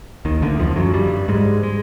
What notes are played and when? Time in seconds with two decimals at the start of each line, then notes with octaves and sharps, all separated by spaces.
0.25 D#2 D#3
0.42 D2 D3
0.59 F2 F3
0.76 F#2 F#3
0.94 G2 G3
1.28 G#2 G#3
1.63 G#3